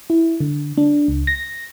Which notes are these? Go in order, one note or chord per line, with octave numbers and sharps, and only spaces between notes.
E4
D3
D4
C#2
A#6